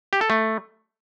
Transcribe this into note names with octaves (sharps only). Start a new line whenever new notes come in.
G4
A4
A3